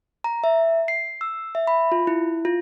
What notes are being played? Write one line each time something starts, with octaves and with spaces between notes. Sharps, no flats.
A#5
E5
C7
E6
E5
B5
F4
E4
F4